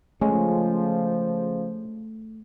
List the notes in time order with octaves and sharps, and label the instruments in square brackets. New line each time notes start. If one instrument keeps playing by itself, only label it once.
[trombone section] C#3 F3 [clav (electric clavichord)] G#3 C#4 [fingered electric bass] A3